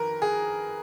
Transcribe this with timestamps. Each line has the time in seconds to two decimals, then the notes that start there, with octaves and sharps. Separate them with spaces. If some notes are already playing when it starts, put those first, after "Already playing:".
Already playing: F2 D#3 A#4 B4
0.22 G#4